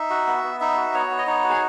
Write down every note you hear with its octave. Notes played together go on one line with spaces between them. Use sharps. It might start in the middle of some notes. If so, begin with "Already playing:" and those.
Already playing: D#4 E5
F#4
B3
B3
D#4 E5
F#4
B3 C#5
B3
D#5
D#4 C#5
F#4
G#4